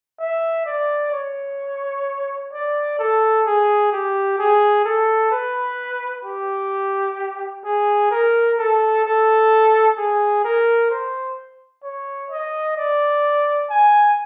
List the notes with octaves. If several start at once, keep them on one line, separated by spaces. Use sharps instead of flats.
E5
D5
C#5
D5
A4
G#4
G4
G#4
A4
B4
G4
G#4
A#4
A4
A4
G#4
A#4
C5
C#5
D#5
D5
G#5